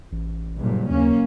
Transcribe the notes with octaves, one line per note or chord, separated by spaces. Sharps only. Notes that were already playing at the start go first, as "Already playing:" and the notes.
A1
F#1 G2 A#2
D#2 A#3 C#4